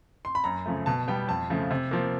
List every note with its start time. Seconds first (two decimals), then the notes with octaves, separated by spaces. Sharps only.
0.25 C6
0.35 B5
0.44 F#2 A#5
0.66 C#3 F3 A3
0.86 B2 A5
1.08 G3 B3 G5
1.28 F2 A5
1.50 C#3 F3 A3
1.71 C3
1.91 F3 A#3